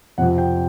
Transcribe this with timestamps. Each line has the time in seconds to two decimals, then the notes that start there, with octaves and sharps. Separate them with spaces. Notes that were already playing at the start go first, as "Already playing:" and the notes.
0.18 F2 C3 F3 F#5
0.38 G5